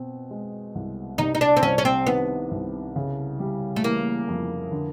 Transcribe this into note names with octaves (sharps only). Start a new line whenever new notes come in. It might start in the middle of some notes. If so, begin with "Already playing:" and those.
Already playing: B2 C4
G#3
C2
C3 D#4
D#4
D4
C4
C2 C#4
C#4
C4
D#3 B3
C2
C#3
G3
A3
E3 A#3
F2
D3